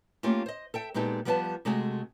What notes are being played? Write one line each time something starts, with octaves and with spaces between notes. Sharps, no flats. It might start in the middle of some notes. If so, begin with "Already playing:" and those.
A3 A#3 C#4 F4 G4
C5 D#5
A4 E5 G5
A#2 G#3 B3 D#4 G4 A4
F3 G3 B3 D#4 B4 A5
C3 G#3 A3 F#4 G#4